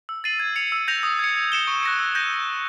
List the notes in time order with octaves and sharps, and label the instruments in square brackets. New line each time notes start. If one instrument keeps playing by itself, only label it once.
[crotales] E6
A6 C7 D#7 F#7
G#6
C#7 F7
E6
G6 A#6 C#7 F7
D#6
G#6 C#7
G#6
C#7 E7 G7
C#6
F#6 A#6 C#7
E6
G6 A#6 D#7